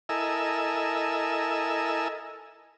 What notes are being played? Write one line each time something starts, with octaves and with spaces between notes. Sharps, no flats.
E4 A4 A#4 D#5 G#5 E6